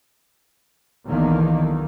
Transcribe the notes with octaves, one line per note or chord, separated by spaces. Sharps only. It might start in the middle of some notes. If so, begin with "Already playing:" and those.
B1 E2 D3 D#3 A#3